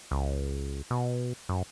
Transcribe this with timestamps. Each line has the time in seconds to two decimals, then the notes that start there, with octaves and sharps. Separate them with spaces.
0.11 C#2
0.91 B2
1.49 F#2